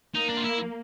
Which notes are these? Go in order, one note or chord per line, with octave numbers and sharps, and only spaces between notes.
A#3 D#4
D4
F4
E4